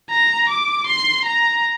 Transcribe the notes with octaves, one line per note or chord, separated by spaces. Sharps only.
A#5
D6
C6
A#5